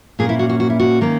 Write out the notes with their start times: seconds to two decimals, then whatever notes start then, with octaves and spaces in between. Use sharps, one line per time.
0.19 A#2 A#3 C#4 G#4
0.29 E4
0.39 F#4
0.49 F#4
0.60 F#4
0.70 E4
0.80 F#4
1.01 D#3 A#3 C#4